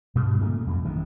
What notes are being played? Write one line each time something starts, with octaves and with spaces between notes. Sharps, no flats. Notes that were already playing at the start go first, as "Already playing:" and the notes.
G2 B2 D3 G3
A#2 C#3 F#3 A3
F2 C#3
A1 D#3 E3